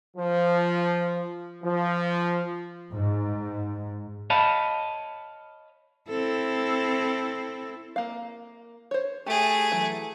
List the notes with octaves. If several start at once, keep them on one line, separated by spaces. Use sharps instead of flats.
F3
F3
G#2
C#5 D#5 F5 A5 B5
C4 E4 A4
A#3 F5
C5 C#5
A3 G4 G#4
E3 F#3